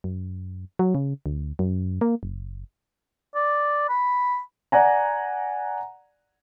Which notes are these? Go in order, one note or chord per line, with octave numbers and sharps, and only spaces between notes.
F#2
F#3
C#3
D2
F#2
A#3
F#1
D5
B5
D5 F#5 G#5 A#5